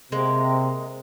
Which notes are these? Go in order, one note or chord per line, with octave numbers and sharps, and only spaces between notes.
C3 G#3 A#3